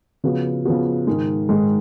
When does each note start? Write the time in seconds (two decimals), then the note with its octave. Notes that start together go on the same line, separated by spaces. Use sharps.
0.24 C#3 F3 B3 F#4
0.65 C#3 F3 B3 F#4
1.07 G#2 D#3 G#3
1.49 G#2 D#3 G#3